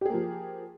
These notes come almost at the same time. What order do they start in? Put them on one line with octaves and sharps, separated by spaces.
G4 G#4 A#3 F3